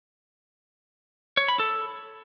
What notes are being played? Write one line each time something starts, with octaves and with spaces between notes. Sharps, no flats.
C#5
B5
A4